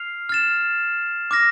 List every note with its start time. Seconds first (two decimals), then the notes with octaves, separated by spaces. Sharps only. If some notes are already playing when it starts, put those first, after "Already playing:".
Already playing: F6 C7 F7
0.29 F6 A6 E7
1.31 D6 F6 A#6